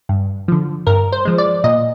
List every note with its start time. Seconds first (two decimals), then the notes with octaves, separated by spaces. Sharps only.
0.09 G2
0.48 D3 F3
0.87 G2 A#4
1.12 C5
1.25 F3 G#3
1.38 D5
1.64 A#2 D#5